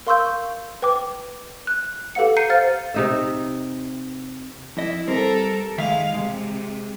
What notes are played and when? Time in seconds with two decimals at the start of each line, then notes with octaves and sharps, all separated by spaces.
0.07 A#4 F5 C6 C#6 E6 G6
0.82 B4 G5 D6
1.67 F#6
2.15 G4 A4 B4 F5 F#5 C#7
2.37 A#5 G6 C7 C#7 D#7
2.50 C5 F5 F6 A6
2.94 C3 D#4 E5
4.77 F2 E4 D#5
5.08 G3 C4 A4 A#4
5.78 D#3 G#3 E5 F5
6.14 C3 G#3